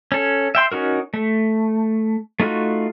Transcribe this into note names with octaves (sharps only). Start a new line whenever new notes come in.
C#4 A4
E5 G5 C6
C#4 D#4 F#4 A#4
A3
A3 D#4 F4 F#4